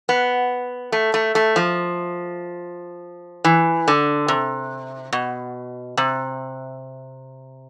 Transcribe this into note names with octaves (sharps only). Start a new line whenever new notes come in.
B3
A3
A3
A3
F3
E3
D3
C3
B2
C3